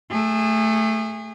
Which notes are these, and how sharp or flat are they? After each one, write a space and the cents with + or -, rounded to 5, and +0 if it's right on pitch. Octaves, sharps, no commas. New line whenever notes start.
A3 +0 G#4 -30